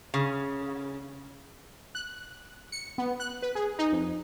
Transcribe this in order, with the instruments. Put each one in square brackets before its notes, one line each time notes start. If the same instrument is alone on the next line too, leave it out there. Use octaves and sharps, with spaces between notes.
[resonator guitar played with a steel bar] C#3
[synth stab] F#6
C#7
B3
F#6
B4
G#4
D#4
F2